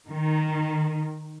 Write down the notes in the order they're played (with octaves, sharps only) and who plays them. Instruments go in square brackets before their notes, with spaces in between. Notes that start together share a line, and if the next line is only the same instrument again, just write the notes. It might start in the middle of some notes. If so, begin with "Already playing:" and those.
[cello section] D#3